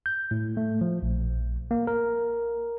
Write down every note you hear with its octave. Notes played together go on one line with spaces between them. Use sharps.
G6
A2
A3
F3
A#1
A#3
A#4